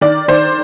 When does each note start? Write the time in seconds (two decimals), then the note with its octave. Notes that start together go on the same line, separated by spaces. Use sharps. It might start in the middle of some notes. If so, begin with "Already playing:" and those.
0.01 D#3 D5
0.28 D#3 C5